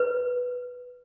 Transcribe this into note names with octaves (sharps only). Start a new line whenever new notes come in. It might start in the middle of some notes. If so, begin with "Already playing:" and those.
Already playing: B4